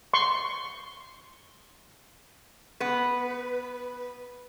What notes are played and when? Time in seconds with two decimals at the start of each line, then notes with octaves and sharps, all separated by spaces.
0.13 C6 C#6
2.80 B3 B4